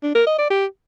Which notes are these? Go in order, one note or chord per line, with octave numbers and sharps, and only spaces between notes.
D4
A#4
D#5
D5
G4